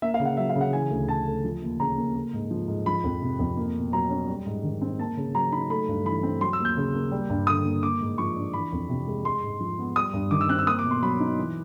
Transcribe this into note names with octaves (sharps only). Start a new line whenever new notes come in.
A#3 E5
F5
C#3
F#5
F#3 E5
F5
C#3
F#5
E3 G#5
D2
C#3 A5
A3
F3
D#2
C#3 A#5
A#3
A#3
G#2
F3
G#2
F3 B5
F2
C3
F2
A#3
B2
F#3 A#5
C#4
G3
G#2
D#3
C4
A#3 A5
C#3
F#3 A#5
D#4 B5
A3 B5
G2
E3 B5
C4
F#3 C6
E6
D#2
G6
C#3
A#3
G3
G2
D3 D#6
A#3
A#3 D6
G#2
F3 C#6
D4
E3 B5
F2
C3
G#3
G#3 C6
G#2
F3
B3
G3 D#6
G2
D#3 D6
E6
C4 F#6
E6
A#3 D#6
D6
B2
C6
F#3 B5
D#4
E3